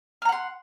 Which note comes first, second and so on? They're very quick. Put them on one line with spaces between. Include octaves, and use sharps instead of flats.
F6 A#5 F#5 C6